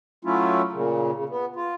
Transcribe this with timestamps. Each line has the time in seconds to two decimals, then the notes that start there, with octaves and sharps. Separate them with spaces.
0.25 F#3 A3 C#4 E4 F4
0.72 A#2 C#3
1.14 C#3
1.29 B3
1.56 F4